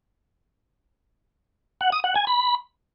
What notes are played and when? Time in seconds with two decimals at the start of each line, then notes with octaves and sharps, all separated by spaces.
1.81 F#5
1.92 D#6
2.04 F#5
2.16 G#5
2.27 B5